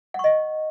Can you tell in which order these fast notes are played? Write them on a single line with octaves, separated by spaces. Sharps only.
F#5 C#6 D#5